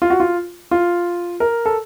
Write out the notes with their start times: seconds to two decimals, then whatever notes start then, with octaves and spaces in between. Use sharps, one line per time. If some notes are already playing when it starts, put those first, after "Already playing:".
0.02 F4
0.10 F#4
0.20 F4
0.71 F4
1.40 A#4
1.66 A4